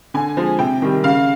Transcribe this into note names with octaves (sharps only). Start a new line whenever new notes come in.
D3 G#5
F3 G#3
C3 G5
D#3 G3
C#3 F5